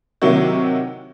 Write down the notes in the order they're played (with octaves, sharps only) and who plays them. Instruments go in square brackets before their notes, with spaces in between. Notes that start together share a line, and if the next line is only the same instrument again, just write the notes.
[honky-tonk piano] C3 D#3 F#3 A#3 E4 F#4